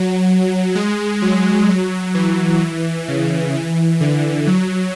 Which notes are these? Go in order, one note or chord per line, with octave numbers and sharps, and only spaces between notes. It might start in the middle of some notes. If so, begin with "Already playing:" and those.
Already playing: F#3
G#3
F#3
F#3
E3
C#3
E3
D3
F#3